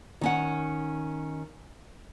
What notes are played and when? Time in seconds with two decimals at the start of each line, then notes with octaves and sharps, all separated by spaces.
0.21 D#3 C#4 F#5